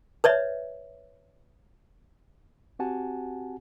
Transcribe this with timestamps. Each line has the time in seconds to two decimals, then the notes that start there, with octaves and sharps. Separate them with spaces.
0.24 B4 C#5 D5 E5
2.79 C4 F#4 G4 F#5 G#5 A5